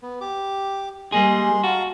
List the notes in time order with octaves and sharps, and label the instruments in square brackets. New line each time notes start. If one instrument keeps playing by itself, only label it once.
[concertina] B3
G4 D6
[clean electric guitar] G3 A#3 G#4 [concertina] G#3 C6
[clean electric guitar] F#4 [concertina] F5 A5 A#5